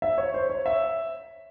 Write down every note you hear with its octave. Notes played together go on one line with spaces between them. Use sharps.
E5
C#5
C5
C#5
E5